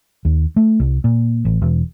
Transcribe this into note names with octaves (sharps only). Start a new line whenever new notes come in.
D#2
A3
C2
A#2
A1
E1